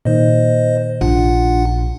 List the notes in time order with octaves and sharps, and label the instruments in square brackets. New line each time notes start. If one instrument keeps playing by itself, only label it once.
[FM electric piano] A#2 D#3 [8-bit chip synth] C5 D#5
[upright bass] A#1 [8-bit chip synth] D4 F4 F#5